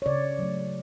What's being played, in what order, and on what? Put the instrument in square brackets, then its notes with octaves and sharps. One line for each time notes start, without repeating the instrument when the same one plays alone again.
[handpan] C#5
C#3 D5
F#3 A3